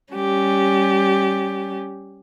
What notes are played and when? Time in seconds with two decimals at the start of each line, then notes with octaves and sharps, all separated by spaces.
0.13 G3 C#4 G4